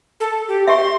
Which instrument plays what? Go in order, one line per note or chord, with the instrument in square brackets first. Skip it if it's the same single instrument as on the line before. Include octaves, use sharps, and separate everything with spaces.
[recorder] A4
G4
[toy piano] G4 D#5 E5 [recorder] C6